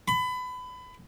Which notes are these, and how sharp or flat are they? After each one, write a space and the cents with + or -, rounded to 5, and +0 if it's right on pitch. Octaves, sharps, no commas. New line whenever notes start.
B5 +25